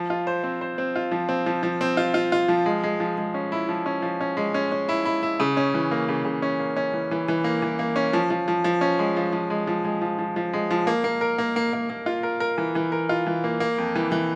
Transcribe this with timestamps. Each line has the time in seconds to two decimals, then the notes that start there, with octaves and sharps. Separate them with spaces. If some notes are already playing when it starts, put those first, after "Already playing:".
Already playing: F3
0.10 F4
0.27 C5
0.44 C4
0.61 C5
0.78 C4
0.96 F4
1.11 F3
1.29 C4
1.46 F3
1.63 F3
1.81 C4
1.97 F4
2.14 F4
2.32 F4
2.48 F3
2.66 G#3
2.83 G#3
3.00 F3
3.18 G#3
3.34 C#4
3.52 E4
3.69 F3
3.86 C#4
4.02 F3
4.21 C#4
4.37 G#3
4.54 C#4
4.72 C#4
4.89 E4
5.05 E4
5.23 E4
5.40 C#3
5.57 C#4
5.74 E3
5.91 A#3
6.09 C#3
6.25 C#3
6.42 C#4
6.60 A#3
6.76 C#4
6.93 E3
7.11 E3
7.28 E3
7.44 A#3
7.62 E3
7.79 A#3
7.96 C#4
8.13 F3
8.30 F3
8.48 F3
8.64 F3
8.81 C#4
8.99 G#3
9.17 F3
9.33 F3
9.50 G#3
9.67 F3
9.85 G#3
10.02 F3
10.19 F3
10.36 F3
10.53 G#3
10.71 F3
10.87 A#3
11.04 A#3
11.21 A#4
11.38 A#3
11.56 A#3
11.73 A#3
11.90 A#3
12.06 F4
12.23 A#4
12.40 A#4
12.58 E3
12.75 E3
12.92 A#4
13.09 F4
13.26 E3
13.44 A#3
13.60 A#3
13.78 F2
13.95 E3
14.12 E3